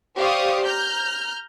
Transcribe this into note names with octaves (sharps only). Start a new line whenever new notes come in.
G4 C5 D5 F5 C#6 D#6
A#5 F6 G6